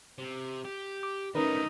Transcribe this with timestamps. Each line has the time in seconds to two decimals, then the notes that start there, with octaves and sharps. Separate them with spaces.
0.18 C3
0.65 G4
1.03 D6
1.35 D#3 A3 C#4 D#4 A#4 B4